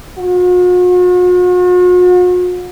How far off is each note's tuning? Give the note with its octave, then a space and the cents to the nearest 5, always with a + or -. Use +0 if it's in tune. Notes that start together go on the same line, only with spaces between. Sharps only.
F#4 -45